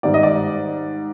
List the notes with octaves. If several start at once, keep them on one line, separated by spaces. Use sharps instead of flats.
G#2 D#3 G3 D5
D#5
D5